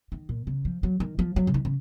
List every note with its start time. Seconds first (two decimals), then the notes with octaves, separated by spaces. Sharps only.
0.12 D#3
0.29 A#2
0.47 C#3
0.65 F3
0.83 F#3
1.00 D#3
1.19 F3
1.36 F#3
1.47 C#3
1.54 D#3
1.65 C#3